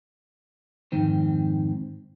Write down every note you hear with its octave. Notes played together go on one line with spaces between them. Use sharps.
F2 G#2 D#3 C4